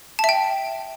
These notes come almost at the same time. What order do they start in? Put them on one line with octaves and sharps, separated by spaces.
A5 E5 G5